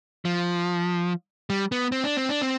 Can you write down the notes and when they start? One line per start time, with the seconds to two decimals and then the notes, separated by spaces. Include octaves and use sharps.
0.25 F3
1.50 G3
1.72 B3
1.92 C4
2.04 D4
2.17 C4
2.29 D4
2.41 C4